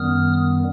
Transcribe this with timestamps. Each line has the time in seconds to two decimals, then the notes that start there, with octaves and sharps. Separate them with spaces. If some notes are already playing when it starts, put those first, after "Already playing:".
Already playing: F#2 D#3 G3 B3 D#6 F6